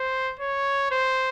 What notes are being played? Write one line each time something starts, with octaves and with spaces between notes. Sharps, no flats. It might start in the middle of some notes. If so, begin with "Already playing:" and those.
Already playing: C5
C#5
C5